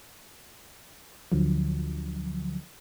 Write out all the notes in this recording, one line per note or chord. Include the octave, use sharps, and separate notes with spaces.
D2 D3 F3 F#3